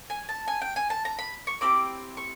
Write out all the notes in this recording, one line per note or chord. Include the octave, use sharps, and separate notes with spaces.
G#5
A5
G#5
G5
G#5
A5
A#5
B5
C#6
C4 E4 G4 D6
C#6